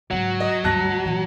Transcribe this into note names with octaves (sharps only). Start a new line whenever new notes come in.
G#2 C#3 F#3
D#5
D2 G2 A5 F#6 A#6
A#2 E3